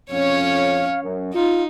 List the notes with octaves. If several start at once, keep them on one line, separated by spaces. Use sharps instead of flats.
F2 C#4 C#5 F5
F#2
D#4 F4